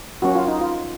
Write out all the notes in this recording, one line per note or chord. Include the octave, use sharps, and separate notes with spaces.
F#3 A#3 C#4 F#4
F4
D#4
F4